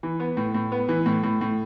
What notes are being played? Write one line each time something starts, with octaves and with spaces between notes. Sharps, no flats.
E3
B3
A2
A2
B3
E3
A2
A2
A2